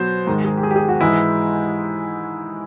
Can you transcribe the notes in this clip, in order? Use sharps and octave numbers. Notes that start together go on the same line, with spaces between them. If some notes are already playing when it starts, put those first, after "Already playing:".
Already playing: B2 F#3 C5
G#2 D#3 G#3
G#4
G4
G#4
G4
G#4
F#4
G#2 E3 G#3 E4